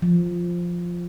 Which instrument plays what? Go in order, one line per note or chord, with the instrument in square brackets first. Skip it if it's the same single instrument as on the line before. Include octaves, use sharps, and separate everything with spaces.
[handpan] F3